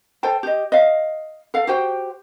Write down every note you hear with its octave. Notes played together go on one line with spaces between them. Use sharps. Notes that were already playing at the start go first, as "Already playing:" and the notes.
A4 C5 G5 A5
G4 D#5
D#5 F5
A4 F5
F#4 G4 C5 G5